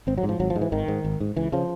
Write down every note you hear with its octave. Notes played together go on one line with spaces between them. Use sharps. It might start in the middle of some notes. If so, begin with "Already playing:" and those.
G#1 C4
F#3
G#2
F3
G#1 F#3
F3
G#2
E3
G#1 D#3
G#2
G#1
G#2
C#2 E3
C#3 F3